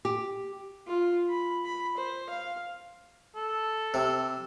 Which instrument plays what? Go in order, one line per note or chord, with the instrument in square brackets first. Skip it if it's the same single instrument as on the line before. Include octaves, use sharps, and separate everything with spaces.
[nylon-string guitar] G4
[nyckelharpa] F4
B5
B5
C5
F5
[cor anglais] A4
[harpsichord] C3